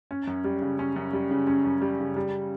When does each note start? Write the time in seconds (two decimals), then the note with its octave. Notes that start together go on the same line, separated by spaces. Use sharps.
0.11 C#4
0.27 F#2
0.44 G3
0.62 C#3
0.79 C#4
0.96 F#2
1.13 G3
1.31 C#3
1.47 C#4
1.64 F#2
1.82 G3
2.00 C#3
2.16 G3